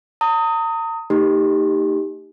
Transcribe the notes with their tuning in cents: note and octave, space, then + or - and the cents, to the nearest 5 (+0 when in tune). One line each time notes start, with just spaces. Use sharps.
A#5 -40 D#6 +15
A3 +35 D#4 +0 G4 +5